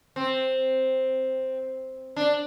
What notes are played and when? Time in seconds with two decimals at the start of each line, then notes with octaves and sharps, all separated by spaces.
0.16 C4
2.16 D4